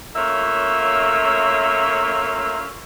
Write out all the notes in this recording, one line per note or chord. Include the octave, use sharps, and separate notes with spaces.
A3 A#3 C#4 F4 C#5 E5